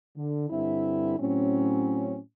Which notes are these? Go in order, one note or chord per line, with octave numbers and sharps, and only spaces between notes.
D3
G2 D3 C4 E4 E5
A2 F#3 C4 C#4